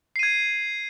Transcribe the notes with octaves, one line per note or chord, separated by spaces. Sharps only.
G#6 C7 D#7